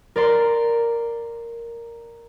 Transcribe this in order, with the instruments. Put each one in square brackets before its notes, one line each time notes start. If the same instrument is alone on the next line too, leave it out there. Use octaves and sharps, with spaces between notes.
[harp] A#4 D5 C6